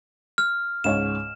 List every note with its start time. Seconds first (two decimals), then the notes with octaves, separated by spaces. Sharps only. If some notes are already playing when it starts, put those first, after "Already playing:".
0.38 F6
0.84 C#2 G#2 C#5 E7